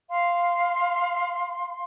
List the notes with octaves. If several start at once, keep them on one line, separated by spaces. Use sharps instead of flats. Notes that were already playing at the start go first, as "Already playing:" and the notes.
F5 C6